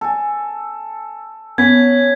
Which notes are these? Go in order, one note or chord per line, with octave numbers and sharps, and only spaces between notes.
A4 G#5
B3 C#4 G#6 B6